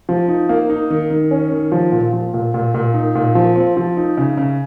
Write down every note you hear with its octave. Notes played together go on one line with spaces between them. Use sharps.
F3
D#4
A#3
D#4
D#3
D#3
C#4
D#3
F3
A#2
F3
A#2
A#2
A#2
D#4
A#2
F3
C4
F3
D#4
C#3
C#3